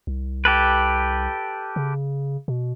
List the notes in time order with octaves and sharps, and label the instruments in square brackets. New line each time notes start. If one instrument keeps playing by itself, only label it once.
[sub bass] C2
[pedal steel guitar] G4 A4 B4
[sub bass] C#3
B2